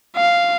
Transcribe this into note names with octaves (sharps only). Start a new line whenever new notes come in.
F5